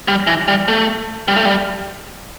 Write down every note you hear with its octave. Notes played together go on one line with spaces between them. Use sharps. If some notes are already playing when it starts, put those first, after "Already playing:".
G3
E3
G3
A3
G3
A3
G3